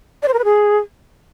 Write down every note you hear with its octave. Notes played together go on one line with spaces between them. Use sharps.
D5
C5
A#4
B4
G#4